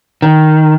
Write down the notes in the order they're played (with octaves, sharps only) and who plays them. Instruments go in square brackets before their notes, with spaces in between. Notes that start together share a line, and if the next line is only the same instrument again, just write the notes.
[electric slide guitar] D#3